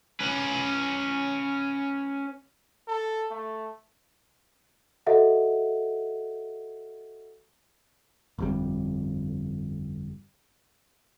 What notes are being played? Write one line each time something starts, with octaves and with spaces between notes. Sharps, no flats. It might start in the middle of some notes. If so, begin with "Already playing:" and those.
C#4 B4
A4
A3
F#4 A4 D#5 E5 F#5
G1 F2 G3